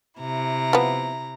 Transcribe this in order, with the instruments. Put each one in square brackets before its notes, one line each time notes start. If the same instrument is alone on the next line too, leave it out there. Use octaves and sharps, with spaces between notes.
[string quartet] C3 E4 A#5
[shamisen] F3 B3